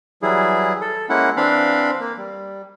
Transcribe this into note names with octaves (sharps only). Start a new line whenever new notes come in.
E3 F#3 G3 E4 G#4
A4
G#3 A#3 C#4 E4 F#5
E3 C4 D4 F5 B5
A#3
G3